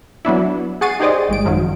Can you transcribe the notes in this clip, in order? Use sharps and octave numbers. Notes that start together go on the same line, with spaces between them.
F#3 B3 D4 E4
G#4 F#5 C#6 A6 C7 D#7
D#4 G4 G#4 C5 D5 D#5
G#1 G#3 D7
F#2 D#3 F3 F#3